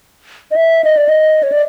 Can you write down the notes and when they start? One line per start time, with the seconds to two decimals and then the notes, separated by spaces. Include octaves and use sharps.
0.51 D#5
0.56 E5
0.84 D#5
0.97 D5
1.09 D#5
1.43 C#5
1.52 D5